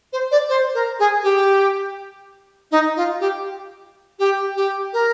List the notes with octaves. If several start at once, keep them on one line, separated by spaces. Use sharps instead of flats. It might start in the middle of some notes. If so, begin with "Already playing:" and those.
C5
D5
C5
A#4
G#4
G4
D#4
F4
G4
G4
G4
A#4